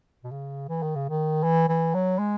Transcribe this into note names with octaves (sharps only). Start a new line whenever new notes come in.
B2
C#3
E3
D#3
C#3
D#3
E3
E3
F#3
G#3